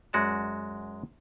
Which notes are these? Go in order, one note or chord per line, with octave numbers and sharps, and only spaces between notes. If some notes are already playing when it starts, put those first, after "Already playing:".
F#2 G#3 F#4 D5 A5